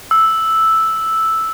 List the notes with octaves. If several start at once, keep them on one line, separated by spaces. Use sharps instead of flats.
E6